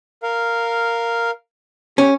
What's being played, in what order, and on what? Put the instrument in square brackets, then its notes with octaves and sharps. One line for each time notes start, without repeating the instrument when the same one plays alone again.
[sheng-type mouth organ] A#4 F5
[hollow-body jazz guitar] C#4 [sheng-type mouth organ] G4